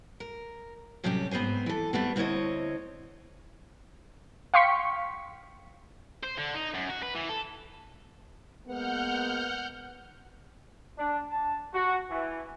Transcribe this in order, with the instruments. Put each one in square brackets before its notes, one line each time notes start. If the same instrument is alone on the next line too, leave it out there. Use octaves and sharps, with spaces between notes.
[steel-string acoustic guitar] A#4
A2 C3 F#3 G3 C#4 G4
G#2 B3 C4 C5 G#5
E3 A4
G3 A3 B3 C4
D2 C4 E4 B4 C#5 D#5
[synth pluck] F5 G5 C6 C#6 B6 C#7
[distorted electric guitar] C5
D3
D#4
F#2
F#4
B4
E3
A4
[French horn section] G#3 A#3 B3 [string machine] F#5 F6 G6
[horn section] D4
A5
F#4
E3